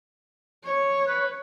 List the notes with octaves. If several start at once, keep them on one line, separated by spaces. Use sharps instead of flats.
C#5
B4